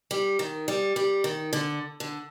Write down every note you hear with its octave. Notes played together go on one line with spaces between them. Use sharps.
G3
D#3
G3
G3
D#3
D3
D3